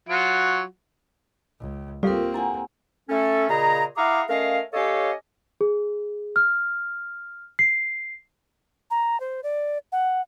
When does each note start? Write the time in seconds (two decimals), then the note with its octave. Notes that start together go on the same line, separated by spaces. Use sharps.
0.09 F#3 F4 F#4
1.60 C#2
2.03 G3 A#3 C4 F4 G4 A4 A#4 F5
2.34 E4 D5 F#5 G#5 A#5
3.09 A3 C#4 A4
3.49 A#2 C#3 G#4 D#5 A#5
3.96 E4 G#4 F5 F#5 A#5 D6
4.29 A3 C#4 A#4 D#5 F5
4.73 C#4 G4 A4 C#5 D#5 F5
5.61 G#4
6.36 F6
7.59 C7
8.91 A#5
9.20 C5
9.43 D5
9.92 F#5